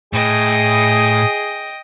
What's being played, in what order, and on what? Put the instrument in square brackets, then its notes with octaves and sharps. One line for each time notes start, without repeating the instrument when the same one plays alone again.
[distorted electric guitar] A2 [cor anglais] G#4 [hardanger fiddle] D#5 G5